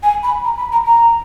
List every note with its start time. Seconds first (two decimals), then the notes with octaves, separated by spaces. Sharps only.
0.03 G#5
0.23 B5
0.45 A#5
0.57 B5
0.72 A#5
0.85 A#5